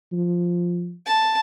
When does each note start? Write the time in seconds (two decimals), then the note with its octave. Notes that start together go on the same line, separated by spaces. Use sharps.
0.12 F3
1.06 A5